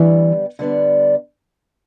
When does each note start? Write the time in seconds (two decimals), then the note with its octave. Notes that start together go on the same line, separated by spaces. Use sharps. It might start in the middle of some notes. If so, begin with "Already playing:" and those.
Already playing: D3 E3 G3 B3 D4
0.59 D3 G3 B3 D4